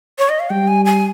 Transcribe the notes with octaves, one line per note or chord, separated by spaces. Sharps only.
C#5
D#5
F5
G3 G5
G#5
G#5